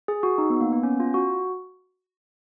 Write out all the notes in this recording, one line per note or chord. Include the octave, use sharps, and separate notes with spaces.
G#4
F#4
D#4
B3
A#3
B3
C#4
F4
F#4